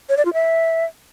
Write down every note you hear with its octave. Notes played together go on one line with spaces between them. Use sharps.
C#5
D5
F4
E5